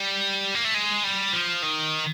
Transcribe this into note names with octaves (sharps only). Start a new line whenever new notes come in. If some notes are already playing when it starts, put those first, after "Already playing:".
Already playing: G3
A#3
A3
G#3
G3
F3
D#3